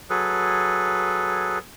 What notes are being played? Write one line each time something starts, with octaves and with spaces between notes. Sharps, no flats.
F#3 G#4 A4 B4